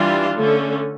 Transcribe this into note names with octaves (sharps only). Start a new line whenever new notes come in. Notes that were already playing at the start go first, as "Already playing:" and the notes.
Already playing: E3 G3 D4 F4
D3 A3 C#4